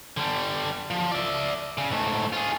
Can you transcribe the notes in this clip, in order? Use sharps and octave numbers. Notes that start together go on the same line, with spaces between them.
D3 G3
F3
D5 E5
C#3
G#2 A3
F4 G#4